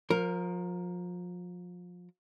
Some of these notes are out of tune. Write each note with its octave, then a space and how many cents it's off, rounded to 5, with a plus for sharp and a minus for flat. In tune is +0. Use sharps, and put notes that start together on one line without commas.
F3 +30 A#4 +0